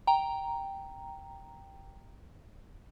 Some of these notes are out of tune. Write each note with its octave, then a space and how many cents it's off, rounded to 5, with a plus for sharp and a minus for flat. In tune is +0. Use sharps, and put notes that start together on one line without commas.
G5 +0 A#5 +0